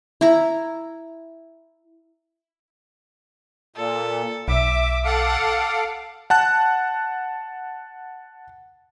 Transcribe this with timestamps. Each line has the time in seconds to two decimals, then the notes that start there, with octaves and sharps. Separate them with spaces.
0.21 E4 A#5
3.76 A#2 A4
4.48 B1 E5 D6
5.05 A4 F5 F#5 D6
6.30 F#5 A5 F#6